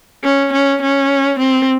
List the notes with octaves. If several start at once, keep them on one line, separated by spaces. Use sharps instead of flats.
C#4
C#4
C#4
C4